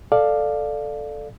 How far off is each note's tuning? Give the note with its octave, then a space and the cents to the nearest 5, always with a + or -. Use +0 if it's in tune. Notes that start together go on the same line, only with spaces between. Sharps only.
A4 +0 D5 +15 F5 +0